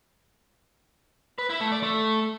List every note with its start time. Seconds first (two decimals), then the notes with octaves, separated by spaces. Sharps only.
1.38 B4
1.50 E4
1.61 A3
1.72 D5
1.83 A3